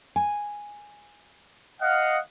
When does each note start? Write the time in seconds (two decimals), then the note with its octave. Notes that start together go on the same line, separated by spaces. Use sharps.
0.16 G#5
1.81 D#5 F5 F#5